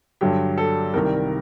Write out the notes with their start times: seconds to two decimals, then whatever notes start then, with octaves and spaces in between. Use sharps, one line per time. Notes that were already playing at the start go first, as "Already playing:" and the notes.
0.21 G2 D3 F#3 G4
0.58 A4
0.94 C2 C3 D#3 A#4